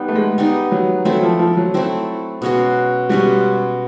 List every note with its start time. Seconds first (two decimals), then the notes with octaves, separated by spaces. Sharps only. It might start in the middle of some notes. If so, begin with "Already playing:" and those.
Already playing: G3 B3 D#4
0.08 A3
0.15 G#3
0.38 G3 B3 D#4
0.72 F#3
1.05 F#3 A3 C4 E4
1.23 F3
1.39 F3
1.57 F#3
1.74 A3 C4 E4
2.42 B2 G#3 C#4 F#4
3.09 B2 G3 G#3 C#4 F#4